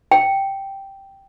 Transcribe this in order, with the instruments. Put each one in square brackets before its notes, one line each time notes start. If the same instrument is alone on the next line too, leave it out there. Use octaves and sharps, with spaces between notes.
[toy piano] G5